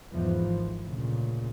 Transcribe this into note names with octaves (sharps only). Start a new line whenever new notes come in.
E2 G#2 E3 F3
G#1
D2 A#2 C#3